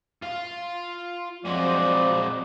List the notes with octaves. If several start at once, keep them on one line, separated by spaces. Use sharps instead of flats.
F4 F5
F3 F#3 G#3 C4 F#4 D5 D#5